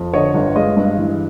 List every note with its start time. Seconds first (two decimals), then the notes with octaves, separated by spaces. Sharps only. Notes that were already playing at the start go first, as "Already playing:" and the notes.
Already playing: F2
0.14 D3 C#5 D#5
0.34 G1
0.56 G#3 D#5 F5
0.77 G2
0.98 E3